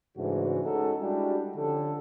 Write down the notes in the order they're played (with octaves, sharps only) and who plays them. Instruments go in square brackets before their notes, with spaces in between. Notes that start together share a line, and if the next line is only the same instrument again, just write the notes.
[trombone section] G#2 C#3 E3 A3 D4 F#4
G#3 C#4 D#4 F#4 G#4 A4
G3 G#3 D4 E4 F#4 G4
D3 F3 C#4 G4 A4